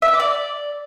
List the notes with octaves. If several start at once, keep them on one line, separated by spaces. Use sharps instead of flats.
E5
E6
D6
D5